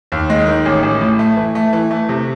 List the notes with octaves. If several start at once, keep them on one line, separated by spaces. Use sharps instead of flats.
D#2
G#3
D#3
A1
A1
A2
A3
E3
A3
E3
A3
C3